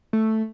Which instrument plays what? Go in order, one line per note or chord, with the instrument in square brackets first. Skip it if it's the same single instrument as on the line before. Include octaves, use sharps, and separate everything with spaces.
[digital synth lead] A3